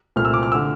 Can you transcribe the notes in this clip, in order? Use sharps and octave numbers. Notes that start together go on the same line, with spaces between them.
C2 A#2 A3 C4 F6
E6
D6
F6
D3 E6